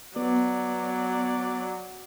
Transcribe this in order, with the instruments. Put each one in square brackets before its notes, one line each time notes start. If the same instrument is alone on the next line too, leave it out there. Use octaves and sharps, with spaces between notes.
[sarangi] F#3 [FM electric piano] B3 [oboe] D5